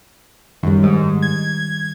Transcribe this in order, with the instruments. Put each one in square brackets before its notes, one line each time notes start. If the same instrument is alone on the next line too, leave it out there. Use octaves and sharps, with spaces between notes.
[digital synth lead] F#2 [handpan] D#3 G3
[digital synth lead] G#2
G#6